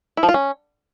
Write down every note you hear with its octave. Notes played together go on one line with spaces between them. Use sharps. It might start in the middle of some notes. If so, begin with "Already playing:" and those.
E4
F3
F4
C#4